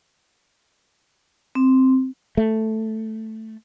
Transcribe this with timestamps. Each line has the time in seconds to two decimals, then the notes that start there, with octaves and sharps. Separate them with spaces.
1.55 C4
2.37 A3